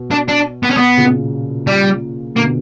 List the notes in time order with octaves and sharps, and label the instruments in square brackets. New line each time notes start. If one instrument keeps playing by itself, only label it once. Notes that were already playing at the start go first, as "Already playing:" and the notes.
Already playing: [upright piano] B2
[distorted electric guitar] D4
D4
B3
C#4
B3
[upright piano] A#2 C#3
[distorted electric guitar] G3
[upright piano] B2 D3 [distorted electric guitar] A#3